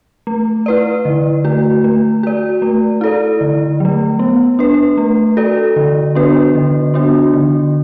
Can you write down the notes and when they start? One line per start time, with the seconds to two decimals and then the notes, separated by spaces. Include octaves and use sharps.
0.27 A3
0.66 E4 B4 D5
1.05 D3
1.45 A3 F#4
1.84 A3
2.23 F#4 D5
2.62 A3
3.01 E4 A4 D5
3.41 D3
3.80 F#3 A3
4.19 B3
4.59 D4 B4
4.97 A3
5.37 F#4 A4 D5
5.76 D3
6.15 B3 D4 F#4 B4
6.55 D3
6.94 B3 D4 F#4
7.34 D3